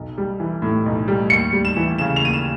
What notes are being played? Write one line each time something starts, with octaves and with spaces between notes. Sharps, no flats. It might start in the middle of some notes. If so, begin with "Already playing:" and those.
Already playing: B1
G3
E3
A2
B1
G3
D#2 C#7
G3
E7
E3
C#3 E7
F7
D#2 D#7
E7